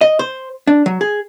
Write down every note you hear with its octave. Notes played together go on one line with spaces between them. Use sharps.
D#5
C5
D4
F#3
G#4